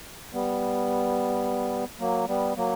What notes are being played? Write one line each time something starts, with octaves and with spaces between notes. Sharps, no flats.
G3 B3
F#3 A#3
G3 B3
F#3 A#3